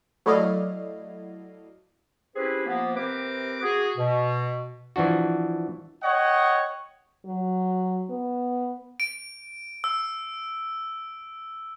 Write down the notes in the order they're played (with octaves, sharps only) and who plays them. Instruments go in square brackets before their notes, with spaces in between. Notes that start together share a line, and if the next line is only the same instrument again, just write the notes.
[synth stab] F#3 A3 E4 D5 D#5 F5
[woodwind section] C4 C#4 E4 G4 G#4 B4
F3 A#3 B3
C3 C4 A#4 B4 D6
F#4 G#4
B2
[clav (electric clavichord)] E3 F3 D4 F#4
[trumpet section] C#5 D#5 F#5 G5
[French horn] F#3
B3
[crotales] D7
E6